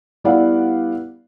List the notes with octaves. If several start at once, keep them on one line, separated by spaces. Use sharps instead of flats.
G3 B3 E4 D5 F5 F#5